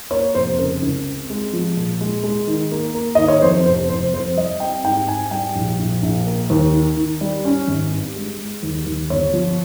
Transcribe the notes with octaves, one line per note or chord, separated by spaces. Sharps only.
A#3 C#5
F1 C5
C#3 A#4
C#2
C4
G#3
F3
A#2
G#3
G#3
D#3
A#3
A#3
D#3 D#5
C#5
F2 C5
F1 C5
F1 C5
F2 C5
G3 D#5
C4 G5
G#2 G5
G#2 G#5
G3 G5
A#1
A#1
A#1
A#3
D#2
D#3
D#3
G3
C#4
G#1
G2
G#3
G#3
D#2
D#2
G1 C#5
F3